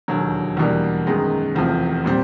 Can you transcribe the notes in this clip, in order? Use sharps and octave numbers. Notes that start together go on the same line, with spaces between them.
E1 D#2 D3 F#3
E2 B2 G3 A#3 D4
F#2 D#3 G#3 B3
F1 E2 C3 F3
A#2 G3 C4